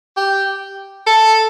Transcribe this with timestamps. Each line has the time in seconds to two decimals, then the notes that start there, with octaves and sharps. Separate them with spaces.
0.17 G4
1.06 A4